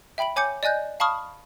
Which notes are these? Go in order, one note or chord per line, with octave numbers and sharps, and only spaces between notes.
E5 G5 B5 D7 F#7
C#5 G#5 D6 G6 C#7
D5 D#5 G#5 F#6 G6
F5 A5 B5 C#6 D#6 F6